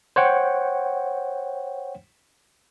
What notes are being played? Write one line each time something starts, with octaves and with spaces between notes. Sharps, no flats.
C5 C#5 F#5 G5